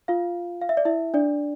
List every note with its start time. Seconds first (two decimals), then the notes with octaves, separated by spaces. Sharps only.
0.08 F4 F5
0.62 F5
0.69 E5
0.77 D5
0.85 E4 E5
1.14 D4 D5